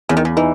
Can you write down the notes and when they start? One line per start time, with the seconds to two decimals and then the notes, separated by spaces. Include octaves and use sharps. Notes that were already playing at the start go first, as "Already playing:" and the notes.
0.09 E2 C#3
0.17 D#3
0.25 C#3
0.37 E3 D#4